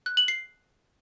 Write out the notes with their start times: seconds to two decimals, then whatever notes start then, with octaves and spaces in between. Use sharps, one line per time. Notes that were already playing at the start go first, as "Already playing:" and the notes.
0.06 F#6
0.17 F#7
0.28 C7